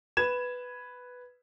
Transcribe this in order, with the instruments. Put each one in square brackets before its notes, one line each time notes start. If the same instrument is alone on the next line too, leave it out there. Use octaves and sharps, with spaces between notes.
[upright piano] B4 G#6 E7